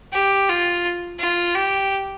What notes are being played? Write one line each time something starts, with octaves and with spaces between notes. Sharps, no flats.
G4
F4
F4
G4